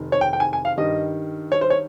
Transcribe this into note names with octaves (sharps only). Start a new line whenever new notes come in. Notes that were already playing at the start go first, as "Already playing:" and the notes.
Already playing: F1 C3 D#3
C#5
G5
G5
G#5
G#5
F5
G2 D#3 G3 D#5
C#5
C5
C#5